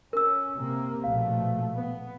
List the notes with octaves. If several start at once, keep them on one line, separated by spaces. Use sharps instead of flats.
C#4 A#4 E6
C3 A#3
A#1 B2 A3 F5
B3